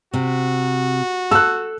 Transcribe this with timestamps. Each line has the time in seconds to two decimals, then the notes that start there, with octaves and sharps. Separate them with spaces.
0.14 C3 F#4
1.31 A4 E6 F#6